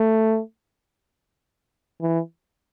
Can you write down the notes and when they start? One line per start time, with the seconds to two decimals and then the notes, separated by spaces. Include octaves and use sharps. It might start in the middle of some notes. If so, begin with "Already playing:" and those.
Already playing: A3
2.01 E3